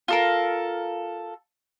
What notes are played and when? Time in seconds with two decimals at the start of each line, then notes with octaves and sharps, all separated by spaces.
0.08 F4 A4 A#4